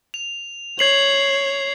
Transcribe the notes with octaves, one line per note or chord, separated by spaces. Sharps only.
F7
C#5 G#6 C7 F#7